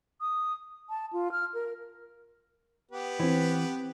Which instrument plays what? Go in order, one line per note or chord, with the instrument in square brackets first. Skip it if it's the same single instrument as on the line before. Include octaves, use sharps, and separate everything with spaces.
[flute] D#6
A5
F4
F6
A#4
[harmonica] B3 G4 B4
[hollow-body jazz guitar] E3 [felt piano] C4 C5